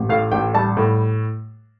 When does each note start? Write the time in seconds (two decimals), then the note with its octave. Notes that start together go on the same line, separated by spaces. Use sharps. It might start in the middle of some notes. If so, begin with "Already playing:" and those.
Already playing: A1
0.09 A2 F5
0.32 A1 G5
0.54 G3 A5
0.77 A2